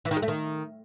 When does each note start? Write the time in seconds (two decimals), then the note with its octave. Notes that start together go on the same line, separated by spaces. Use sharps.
0.05 E3
0.11 D#3
0.17 G#3
0.22 A3
0.28 D#3